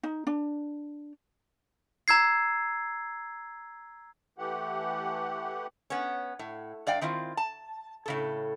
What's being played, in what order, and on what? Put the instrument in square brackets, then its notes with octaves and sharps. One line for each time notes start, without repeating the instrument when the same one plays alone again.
[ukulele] D#4
D4
[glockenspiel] A#5 E6 G#6 C7
[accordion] E3 A3 G4 F#5
[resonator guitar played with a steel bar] B3 C#4
A2
G2 D5 F5 G5
D#3 C4 E4 F4
A5
A2 C#3 A4